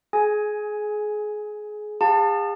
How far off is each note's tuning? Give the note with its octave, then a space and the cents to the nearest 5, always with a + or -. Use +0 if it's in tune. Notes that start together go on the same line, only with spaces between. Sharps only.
G#4 +25 G#5 +5
G#4 -40 F5 +35 A5 +20